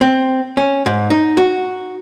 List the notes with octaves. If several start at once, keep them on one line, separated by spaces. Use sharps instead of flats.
C4
C#4
G#2
D#4
F#4